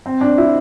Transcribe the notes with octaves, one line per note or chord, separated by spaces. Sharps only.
C4
D4
E4